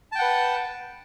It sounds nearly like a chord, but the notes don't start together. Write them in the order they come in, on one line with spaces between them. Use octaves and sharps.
A5 G5 F#5 B4